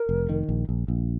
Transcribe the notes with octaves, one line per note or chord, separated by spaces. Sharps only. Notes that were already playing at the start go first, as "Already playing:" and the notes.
Already playing: A#4
F1
D#3
A#1
A#1
A#1